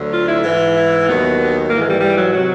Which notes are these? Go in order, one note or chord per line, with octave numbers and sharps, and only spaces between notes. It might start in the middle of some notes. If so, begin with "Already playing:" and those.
Already playing: D2 D3 F#3
F4
E4
G#2 E3
E4
D#2 D#3 F#3 B3
G#2 E3 A#3
G#3
G3
G3
F#3
C3 D#3 F#3